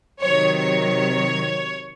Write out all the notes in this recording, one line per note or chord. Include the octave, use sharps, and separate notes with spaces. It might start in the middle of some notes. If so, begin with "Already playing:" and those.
C3 D#3 F#3 C#5
C#5